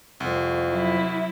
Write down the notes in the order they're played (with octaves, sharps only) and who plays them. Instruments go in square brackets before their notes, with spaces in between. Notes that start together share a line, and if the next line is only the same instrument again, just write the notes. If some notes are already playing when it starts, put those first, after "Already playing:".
[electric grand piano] C2 [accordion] F2
[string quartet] F#3 E4